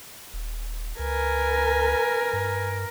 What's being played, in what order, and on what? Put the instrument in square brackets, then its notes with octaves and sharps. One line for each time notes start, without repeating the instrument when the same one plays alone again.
[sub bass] D#1
[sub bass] C#2 [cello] A#4 [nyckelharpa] B4 G#5
[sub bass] G2